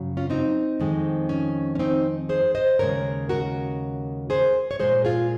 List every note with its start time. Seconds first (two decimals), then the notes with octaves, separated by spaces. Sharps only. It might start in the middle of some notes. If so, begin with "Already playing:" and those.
Already playing: F#2 C#3 F#3
0.17 C#4 F4
0.30 C4 D#4
0.80 F2 D#3 G#3
1.29 C#4
1.75 C#4
1.79 C4 D#4
2.29 G#4 C5
2.55 C5 D#5
2.79 D#2 C#3 G#3 A#4 C#5
3.29 F#4 A#4
4.30 G#4 C5
4.71 C#5
4.79 A#2 G#3 G#4 C5
5.05 F4 G#4